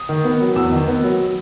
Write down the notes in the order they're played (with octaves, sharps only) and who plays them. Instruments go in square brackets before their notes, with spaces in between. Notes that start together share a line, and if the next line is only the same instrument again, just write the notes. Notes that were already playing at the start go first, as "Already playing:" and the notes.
Already playing: [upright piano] D#6
D#3
B3
F#3
E2 E6
D#3
B3
F#3